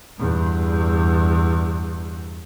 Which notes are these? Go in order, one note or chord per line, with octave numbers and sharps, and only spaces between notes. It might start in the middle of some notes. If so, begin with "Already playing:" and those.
E2 G2